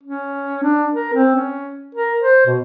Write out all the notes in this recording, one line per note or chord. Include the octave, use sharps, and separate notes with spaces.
C#4
D4
A#4
C4
C#4
A#4
C5
B2